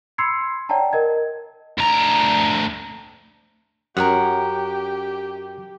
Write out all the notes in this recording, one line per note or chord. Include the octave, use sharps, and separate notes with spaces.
B5 C6 E6 G#6 C7 C#7
C#5 D5 F#5 G5 A5 A#5
A#4 D#5 G#6
D2 A#5
F#2 G4 A#4 C#5 F#5